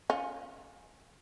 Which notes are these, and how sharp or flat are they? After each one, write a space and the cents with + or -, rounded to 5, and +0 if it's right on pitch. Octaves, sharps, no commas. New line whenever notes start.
C#4 +0 F4 +25 F5 +0